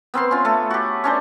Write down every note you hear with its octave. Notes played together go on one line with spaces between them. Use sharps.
B3 C4 A#4 C6
C#4 F4
A3 A4
F#4 G4
C#4 D4 C5